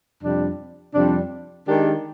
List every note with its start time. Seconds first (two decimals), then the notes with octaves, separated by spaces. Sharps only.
0.22 F2 C3 G3 D4
0.94 F2 C3 G3 D4
1.67 D#3 G#3 D4 G4 A#4